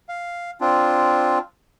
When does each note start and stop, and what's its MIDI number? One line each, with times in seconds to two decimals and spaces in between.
0.09 0.51 77
0.61 1.39 60
0.61 1.39 62
0.61 1.39 65